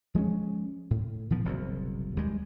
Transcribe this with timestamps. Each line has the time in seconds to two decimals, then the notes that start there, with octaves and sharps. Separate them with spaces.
0.15 F3 G#3 A3 C#4
0.91 A2
1.30 A#2 E3 F3 B3
1.45 F#1 C2 B2
2.16 D#2 G3 G#3